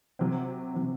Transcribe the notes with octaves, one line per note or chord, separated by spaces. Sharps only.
C3 F#3 C4
C3 F#3 C4